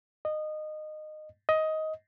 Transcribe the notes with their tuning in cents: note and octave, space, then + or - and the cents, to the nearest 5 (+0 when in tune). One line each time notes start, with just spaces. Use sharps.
D#5 -20
D#5 +15